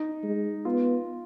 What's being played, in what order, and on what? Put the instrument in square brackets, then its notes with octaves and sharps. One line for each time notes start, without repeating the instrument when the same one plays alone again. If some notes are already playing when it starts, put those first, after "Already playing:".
Already playing: [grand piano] D#4
[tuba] G#3
[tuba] B3 [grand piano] F4